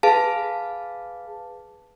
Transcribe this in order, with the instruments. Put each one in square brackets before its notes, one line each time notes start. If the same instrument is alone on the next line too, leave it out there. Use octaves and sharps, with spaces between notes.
[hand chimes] G#4 B4 F5 A5